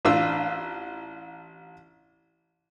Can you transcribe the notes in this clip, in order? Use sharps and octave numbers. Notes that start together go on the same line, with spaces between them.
A1 D4 F4 F5 E6